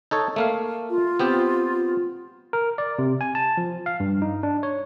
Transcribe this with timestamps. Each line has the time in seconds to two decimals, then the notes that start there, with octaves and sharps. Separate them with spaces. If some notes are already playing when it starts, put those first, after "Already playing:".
0.11 D#4 A4 C#5
0.36 A3 A#3 F5
0.90 F4
1.19 B3 C4 G4
2.53 A#4
2.78 D5
2.99 C3
3.21 G#5
3.35 A5
3.57 F3
3.86 F5
4.00 G2
4.22 D#4
4.43 D4
4.63 C#5